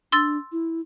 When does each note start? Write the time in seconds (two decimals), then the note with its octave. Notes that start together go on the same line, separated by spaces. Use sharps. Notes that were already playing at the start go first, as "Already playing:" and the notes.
0.12 D4 C6 E6 A6
0.52 E4